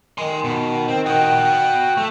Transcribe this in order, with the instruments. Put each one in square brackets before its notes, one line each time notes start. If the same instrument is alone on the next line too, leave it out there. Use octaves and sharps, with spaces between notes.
[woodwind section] D#3 [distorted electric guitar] G#5 C6
[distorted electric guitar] B2
C4
[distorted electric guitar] F#4 D#5 [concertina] G5 F#6
[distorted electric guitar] A3